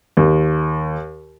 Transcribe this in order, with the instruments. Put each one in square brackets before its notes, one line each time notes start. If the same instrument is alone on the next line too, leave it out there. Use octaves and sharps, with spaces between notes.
[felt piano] D#2